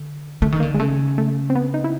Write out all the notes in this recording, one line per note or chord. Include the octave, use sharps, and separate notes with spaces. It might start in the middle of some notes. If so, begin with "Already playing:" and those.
Already playing: D3
D3 A3
D#3
D3 A#3
G#3
C#3 A3
A3
C4
B3
D#4
E4